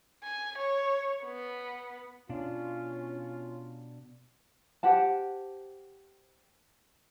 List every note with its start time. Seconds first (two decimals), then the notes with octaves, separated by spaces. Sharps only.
0.24 G#5
0.58 C#5
1.24 B3
2.29 B2 C#4 D4 F4 D5
4.83 G4 C5 F#5 A5